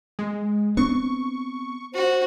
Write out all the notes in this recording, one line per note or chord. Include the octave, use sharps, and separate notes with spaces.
G#3
B3 C4 D4 C#6
F#4 C5